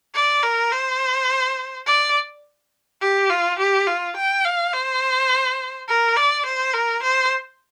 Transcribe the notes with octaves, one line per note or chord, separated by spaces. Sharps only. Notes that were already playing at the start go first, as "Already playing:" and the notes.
D5
A#4
C5
D5
G4
F4
G4
F4
G5
F5
C5
A#4
D5
C5
A#4
C5